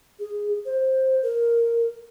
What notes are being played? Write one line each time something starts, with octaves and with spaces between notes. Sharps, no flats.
G#4
C5
A#4